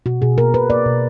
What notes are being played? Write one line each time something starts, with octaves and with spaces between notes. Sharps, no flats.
B2 F#4
B2 G#4
A#3 A#4
B2 B4
A#3 D5
B2